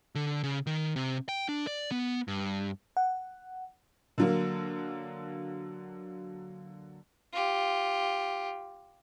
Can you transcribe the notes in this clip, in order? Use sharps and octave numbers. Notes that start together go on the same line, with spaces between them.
D3
C#3
D#3
C3
G5
D4
D5
B3
G2
F#5
D3 F#3 A#3
F4 G4